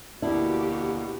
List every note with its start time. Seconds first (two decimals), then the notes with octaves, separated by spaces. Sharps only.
0.22 D2 B2 A#3 D4 E4 F#4 G4